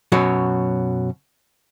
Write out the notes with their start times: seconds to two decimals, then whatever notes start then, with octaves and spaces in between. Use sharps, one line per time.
0.12 F#2 B2 F#3